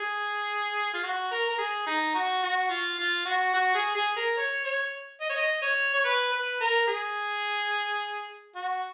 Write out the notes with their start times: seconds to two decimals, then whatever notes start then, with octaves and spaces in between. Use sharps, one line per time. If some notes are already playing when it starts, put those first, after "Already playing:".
Already playing: G#4
0.94 F4
1.03 F#4
1.31 A#4
1.49 A#4
1.59 G#4
1.87 D#4
2.15 F#4
2.43 F#4
2.70 F4
2.99 F4
3.25 F#4
3.54 F#4
3.75 G#4
3.95 G#4
4.16 A#4
4.37 C#5
4.65 C#5
5.21 D#5
5.29 C#5
5.36 D#5
5.62 C#5
5.94 C#5
6.05 B4
6.32 B4
6.60 A#4
6.87 G#4
8.56 F#4